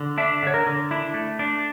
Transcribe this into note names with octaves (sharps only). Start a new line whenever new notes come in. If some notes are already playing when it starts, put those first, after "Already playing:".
Already playing: D3
D4 E5
D3 C#5
A#4
D3
D4 E4
A3
D4